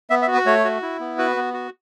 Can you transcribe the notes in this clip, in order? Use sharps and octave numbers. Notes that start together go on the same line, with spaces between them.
B3 E5
E5
F#4
B4
A3 C#5
F#4
E4
B3
F#4 B4
B3
F#4